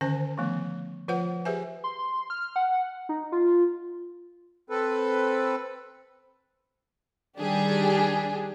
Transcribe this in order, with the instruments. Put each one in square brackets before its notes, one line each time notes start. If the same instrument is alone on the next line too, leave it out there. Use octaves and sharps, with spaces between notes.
[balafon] D3 D#3 C#4 C5 G#5
D#3 F3 A3 B3
F3 F4 B4 C5 F#5
G4 G#4 B4 C5 E5 G#5
[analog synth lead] C6
F6
F#5
D#4
F4
[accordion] C4 A4 B4
[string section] D#3 G3 D4 G4 G#4